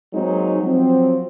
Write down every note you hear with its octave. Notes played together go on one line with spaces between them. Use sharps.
F#3 G#3 A#3 C4 D#4
F3 F#3 C4